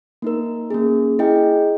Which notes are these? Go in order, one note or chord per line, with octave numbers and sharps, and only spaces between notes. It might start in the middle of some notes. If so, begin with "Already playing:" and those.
A#3 D#4 A#4
A#3 C#4 G#4
E4 G#4 D#5 G5